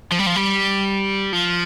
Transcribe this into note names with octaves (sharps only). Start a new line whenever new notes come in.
F3
G3
F3
G3
F3